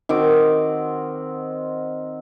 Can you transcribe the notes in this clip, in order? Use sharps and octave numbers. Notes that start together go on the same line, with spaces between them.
D#3 C4 F#4 D6